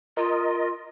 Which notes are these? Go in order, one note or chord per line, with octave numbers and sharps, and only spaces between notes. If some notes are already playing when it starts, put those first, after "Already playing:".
F4 A#4 D#5